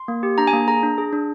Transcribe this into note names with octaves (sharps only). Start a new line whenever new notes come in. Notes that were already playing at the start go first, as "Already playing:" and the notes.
Already playing: C6
A#3
G4
D4 A#5
G#5
A#3
G#4 A#5
D4
G#4
D4